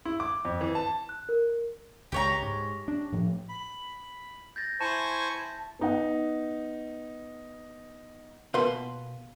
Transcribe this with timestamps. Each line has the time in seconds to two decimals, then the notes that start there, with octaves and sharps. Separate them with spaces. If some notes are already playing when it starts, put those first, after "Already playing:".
0.05 E4
0.20 D6
0.45 F2
0.61 E3
0.75 A5
1.09 F#6
1.29 A#4
2.12 C#2 G4 C#5 A#5
2.43 G#2
2.88 D4
3.12 A2 F3
3.49 B5
4.56 G6 A6 A#6
4.81 E4 C5 G#5 A5 C#6
5.79 B3 D#4 F#5
8.54 B2 A#3 F4 F#4 B4 C6